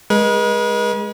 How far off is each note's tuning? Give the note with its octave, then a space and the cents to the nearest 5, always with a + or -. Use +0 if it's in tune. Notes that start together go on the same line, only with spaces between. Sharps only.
G#3 +0 B4 -40